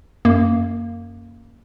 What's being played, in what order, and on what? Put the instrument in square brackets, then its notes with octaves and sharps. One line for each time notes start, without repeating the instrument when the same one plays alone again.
[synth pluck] F#2 A#3